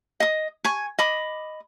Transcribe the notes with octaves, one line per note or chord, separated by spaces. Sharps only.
D#5 D#6
G#5 C#6
D#5 B5 D6